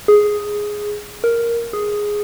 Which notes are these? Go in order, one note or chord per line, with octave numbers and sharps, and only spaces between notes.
G#4
A#4
G#4